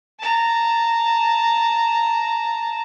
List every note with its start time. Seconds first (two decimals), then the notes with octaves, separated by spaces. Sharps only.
0.20 A5 A#5